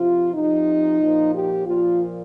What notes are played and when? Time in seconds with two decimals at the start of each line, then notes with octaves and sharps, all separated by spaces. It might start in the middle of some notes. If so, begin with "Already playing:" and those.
Already playing: C3 F3 F4
0.33 C3 F3 D#4
1.00 A#2 F3
1.34 G4
1.66 A#2 F3 F4